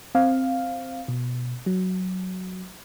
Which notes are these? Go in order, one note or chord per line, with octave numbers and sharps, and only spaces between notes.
C4 F5
B2
F#3